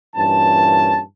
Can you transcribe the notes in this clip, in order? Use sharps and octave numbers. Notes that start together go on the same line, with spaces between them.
G2 A#2 E3 C#4 A5